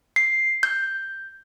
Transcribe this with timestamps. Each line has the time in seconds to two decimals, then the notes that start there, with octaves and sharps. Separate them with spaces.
0.16 C7
0.63 G6